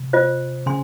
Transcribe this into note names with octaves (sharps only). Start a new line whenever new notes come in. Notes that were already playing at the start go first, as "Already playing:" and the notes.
Already playing: C3
F4 C5 D#5
C#3 G#5 C6